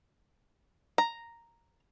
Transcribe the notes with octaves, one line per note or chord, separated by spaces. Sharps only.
A#5